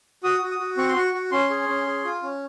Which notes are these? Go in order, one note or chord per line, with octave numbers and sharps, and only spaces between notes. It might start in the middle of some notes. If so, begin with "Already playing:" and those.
F#4 D#6
F#4
D#6
F#4
C4 C#6
C6
F#4 C#6
F#4
C#4 C6
G#4
C#4
G#4
F4
C#4